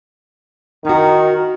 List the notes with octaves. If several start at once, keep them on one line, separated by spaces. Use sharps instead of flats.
D#3 D#4 F#4